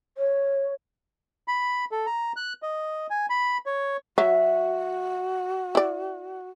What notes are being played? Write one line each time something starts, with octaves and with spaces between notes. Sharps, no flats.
C#5
B5
A4
A#5
F#6
D#5
G#5
B5
C#5
F#3 F#4 E5
E4 D5